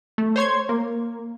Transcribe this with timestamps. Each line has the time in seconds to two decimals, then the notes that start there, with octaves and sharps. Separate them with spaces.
0.18 A3
0.36 C5 C#5 C6 G#6
0.69 A#3